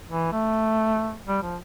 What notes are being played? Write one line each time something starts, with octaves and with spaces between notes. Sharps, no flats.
E3
A3
G3
F3